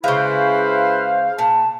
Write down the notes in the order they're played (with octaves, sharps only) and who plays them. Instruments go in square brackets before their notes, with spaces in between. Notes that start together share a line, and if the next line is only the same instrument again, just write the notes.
[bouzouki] C#3 G#3 [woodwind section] E4 B4 C5 [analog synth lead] F5
[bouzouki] A#2 [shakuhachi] A5